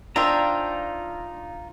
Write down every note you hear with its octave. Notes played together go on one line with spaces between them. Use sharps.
D4 D#4 F4 C5 E5 G5 A#5